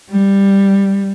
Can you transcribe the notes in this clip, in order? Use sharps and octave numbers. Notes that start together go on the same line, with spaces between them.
G3